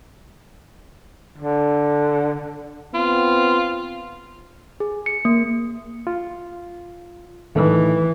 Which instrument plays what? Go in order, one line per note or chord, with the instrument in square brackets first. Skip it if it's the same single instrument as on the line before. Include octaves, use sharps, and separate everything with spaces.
[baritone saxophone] D3
[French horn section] B3 C4 [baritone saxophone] F4
[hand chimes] G#4
C#7
A#3
[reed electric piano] F4
[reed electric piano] A2 D#3 A3 [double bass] E3